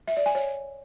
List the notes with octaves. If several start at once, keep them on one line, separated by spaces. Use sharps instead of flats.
E5
D5
G#5
C#5